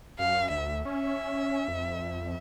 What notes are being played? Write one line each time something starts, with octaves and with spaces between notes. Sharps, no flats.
F#2 F5
D2 E5
C#4 E5
F2